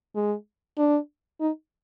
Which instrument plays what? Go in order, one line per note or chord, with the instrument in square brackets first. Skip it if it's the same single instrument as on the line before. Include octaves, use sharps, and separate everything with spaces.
[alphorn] G#3
D4
D#4